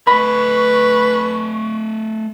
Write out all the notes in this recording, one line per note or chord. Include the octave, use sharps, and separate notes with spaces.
A3 B4 D#5 B5 C#6